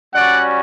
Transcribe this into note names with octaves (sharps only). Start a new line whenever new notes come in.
G3 C#4 F#4 D5 F#5